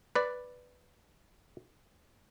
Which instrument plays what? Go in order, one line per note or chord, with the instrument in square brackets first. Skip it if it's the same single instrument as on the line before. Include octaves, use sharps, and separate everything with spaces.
[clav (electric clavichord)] B4 D5